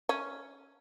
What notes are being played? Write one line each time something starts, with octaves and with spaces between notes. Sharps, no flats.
C#4